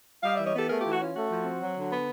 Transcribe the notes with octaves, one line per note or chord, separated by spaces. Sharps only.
G3 D#5 F5
E3 D5 E5
C#5 D#5
B3 G4 A4
A3 G#4 A#4
E3 F4 G4
F#4
C#4 F4
A3 F#4
F3
C4
F#3
D3
B3